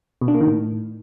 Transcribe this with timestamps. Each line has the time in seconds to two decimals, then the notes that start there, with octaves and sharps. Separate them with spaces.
0.21 B2
0.28 D4
0.34 A#3
0.41 D#3
0.47 A2